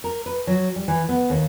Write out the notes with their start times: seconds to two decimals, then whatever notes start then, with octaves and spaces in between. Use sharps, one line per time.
0.04 A#4
0.26 B4
0.47 F#3
0.76 G3
0.88 E3
1.09 B3
1.30 D#2